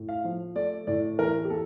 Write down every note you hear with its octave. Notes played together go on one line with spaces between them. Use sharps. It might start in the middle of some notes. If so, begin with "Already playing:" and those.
Already playing: A2
F5
F3
A3 D5
A2 D5
E3 A#4
G4
A#3 A4